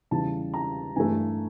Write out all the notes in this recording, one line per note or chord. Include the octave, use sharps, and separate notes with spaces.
E2 C#3 E3 G3 A5
A#5
G2 E3 A3 G#5